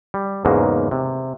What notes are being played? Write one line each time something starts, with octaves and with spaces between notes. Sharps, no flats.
G3
E2 G#2 C#3 A#3 F#4
C3